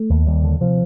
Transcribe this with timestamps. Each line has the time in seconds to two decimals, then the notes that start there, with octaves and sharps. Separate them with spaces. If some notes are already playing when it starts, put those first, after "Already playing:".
Already playing: A3
0.10 D#2
0.27 D#2 G3
0.43 D3
0.61 C3 F3